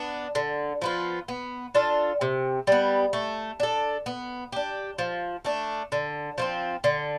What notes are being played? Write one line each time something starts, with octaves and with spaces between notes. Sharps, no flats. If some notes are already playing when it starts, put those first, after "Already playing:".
Already playing: B3 D4
D3
F3 B3 F4
B3
D4 F4 A4
C3
G3 B3
A3
D4 A4
B3
D4 G4
F3
A3 D4
D3
F3 A3 C4
D3